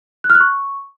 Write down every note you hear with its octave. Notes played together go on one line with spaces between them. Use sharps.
F#6
F6
F#6
C#6